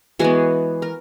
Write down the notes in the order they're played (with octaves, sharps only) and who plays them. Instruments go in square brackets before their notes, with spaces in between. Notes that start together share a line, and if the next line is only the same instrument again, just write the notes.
[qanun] E3 G#3 B3 F#4 G#4
A#4